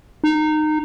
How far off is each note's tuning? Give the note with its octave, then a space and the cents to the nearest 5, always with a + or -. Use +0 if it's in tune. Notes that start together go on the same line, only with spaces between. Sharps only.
D#4 -20